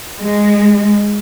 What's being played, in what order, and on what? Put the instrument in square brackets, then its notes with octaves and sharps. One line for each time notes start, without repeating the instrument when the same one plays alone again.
[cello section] G#3